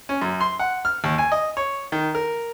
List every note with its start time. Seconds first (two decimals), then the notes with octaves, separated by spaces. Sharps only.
0.09 C#4
0.22 F#2
0.40 C6
0.59 F#5
0.85 F6
1.04 D#2
1.18 G#5
1.32 D#5
1.57 C#5
1.92 D#3
2.15 A#4